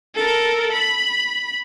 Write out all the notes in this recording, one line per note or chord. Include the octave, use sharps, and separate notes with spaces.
A4 A#4
B5